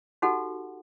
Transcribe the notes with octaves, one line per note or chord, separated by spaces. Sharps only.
D#4 F#4 G4 A4 F#5